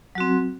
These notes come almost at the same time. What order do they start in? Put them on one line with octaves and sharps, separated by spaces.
F#3 F#4 C4